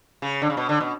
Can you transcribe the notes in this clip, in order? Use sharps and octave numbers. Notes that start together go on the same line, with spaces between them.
C#3
D3
C#3
B2
D3
B2